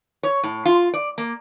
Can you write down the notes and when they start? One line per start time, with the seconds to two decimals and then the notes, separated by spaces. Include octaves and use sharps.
0.23 C#5
0.43 A2
0.65 F4
0.94 D5
1.18 A#3